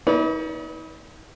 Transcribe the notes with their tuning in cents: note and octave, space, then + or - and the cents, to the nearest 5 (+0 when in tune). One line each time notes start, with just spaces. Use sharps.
D#4 +40 B4 -20 D5 -35